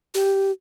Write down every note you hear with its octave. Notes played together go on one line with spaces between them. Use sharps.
G4